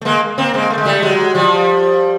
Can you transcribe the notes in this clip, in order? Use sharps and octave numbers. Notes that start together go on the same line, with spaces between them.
A3
G#3 A#3
A#3 C4
G#3 A#3
A3
G#3
G3 A3
F#3 G#3
F3 G3